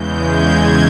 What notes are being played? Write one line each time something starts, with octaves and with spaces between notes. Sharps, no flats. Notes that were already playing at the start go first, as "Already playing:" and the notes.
Already playing: E2 C#3 E3 G#3 G6
G#6